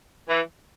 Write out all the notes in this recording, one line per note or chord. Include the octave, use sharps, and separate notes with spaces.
E3